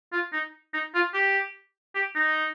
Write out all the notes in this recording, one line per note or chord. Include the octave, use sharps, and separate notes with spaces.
F4
D#4
D#4
F4
G4
G4
D#4